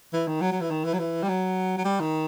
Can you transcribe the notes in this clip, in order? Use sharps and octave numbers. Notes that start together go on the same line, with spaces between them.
E3
D#3
F#3
F#3
E3
D#3
E3
F#3
E3
G3
F#3
F#3
G3
D#3